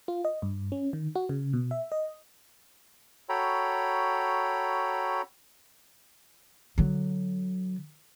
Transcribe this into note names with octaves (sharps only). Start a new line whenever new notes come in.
F4
D#5
G2
C#4
D#3
F#4
C#3
B2
E5
D#5
F#4 A4 C#5 G5 A#5 B5
D3 F#3